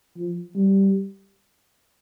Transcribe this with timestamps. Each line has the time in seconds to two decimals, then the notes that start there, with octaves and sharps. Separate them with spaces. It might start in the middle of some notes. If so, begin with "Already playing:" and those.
0.17 F3
0.56 G3